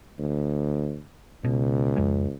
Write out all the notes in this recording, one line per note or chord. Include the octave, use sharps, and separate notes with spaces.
D2
C#2 B2
F2 G#3 C#4